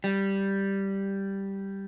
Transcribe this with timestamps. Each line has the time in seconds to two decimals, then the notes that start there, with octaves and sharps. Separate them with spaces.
0.04 G3